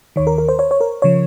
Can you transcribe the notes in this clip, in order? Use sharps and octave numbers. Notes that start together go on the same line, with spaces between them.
D#2 D#3 C#5
A#4
A#4
C5
C#5
C#5
A#4
C#3 F3 C#5